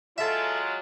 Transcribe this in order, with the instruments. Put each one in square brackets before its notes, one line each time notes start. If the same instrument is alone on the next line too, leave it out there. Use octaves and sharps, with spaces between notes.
[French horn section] F#3 G#3 [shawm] F4 [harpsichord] A4 E5